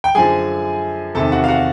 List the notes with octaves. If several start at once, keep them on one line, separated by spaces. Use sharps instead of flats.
G5
F#2 D3 F3 G#4 G#5
E2 C3 D#3 A4 A5
F#4 F#5
F5
F#4 F#5